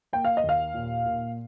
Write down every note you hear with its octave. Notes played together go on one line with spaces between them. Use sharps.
A#3 G5
F5
D#5
D#2
F5
A#2
A#2